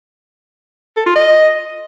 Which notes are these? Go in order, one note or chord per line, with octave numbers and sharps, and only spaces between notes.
A4
F4
D#5